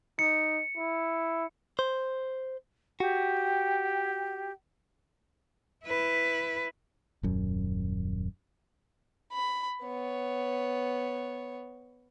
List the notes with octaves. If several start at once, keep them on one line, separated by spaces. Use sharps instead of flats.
D#4 C#7
E4
C5
F#4 G4 G5
E4 B4
D#1 F#2
B5
B3 C#5